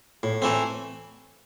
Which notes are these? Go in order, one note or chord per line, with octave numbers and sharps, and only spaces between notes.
A2
E3 A3 C4